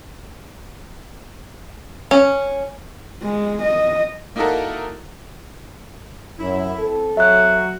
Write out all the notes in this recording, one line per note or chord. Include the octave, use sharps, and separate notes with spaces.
C#4
G#3
D#5
A#3 D#4 E4 F#4 A4 A#4
F#2 E4
C4 A4
F#3 F#4 E5 F#6